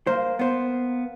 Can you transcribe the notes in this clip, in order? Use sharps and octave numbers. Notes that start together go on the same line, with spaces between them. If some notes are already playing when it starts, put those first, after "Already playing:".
A#3 C5
B3 C5